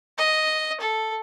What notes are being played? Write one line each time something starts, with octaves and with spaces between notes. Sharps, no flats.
D#5
A4